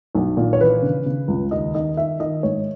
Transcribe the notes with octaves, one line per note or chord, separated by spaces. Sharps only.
B1
A#2
C#5
E3 B4
C#3
C#3
C#2
D#2 D#5
D#3 D#5
D#3 E5
D#3 D#5
G#2 C#5